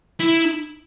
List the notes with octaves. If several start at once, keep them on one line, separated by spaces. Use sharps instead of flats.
E4